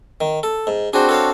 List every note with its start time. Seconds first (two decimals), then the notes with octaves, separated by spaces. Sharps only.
0.21 D#3
0.43 A4
0.67 G#2
0.93 C4 D4 F#4 G#4 C5
1.09 A4 C#5 F5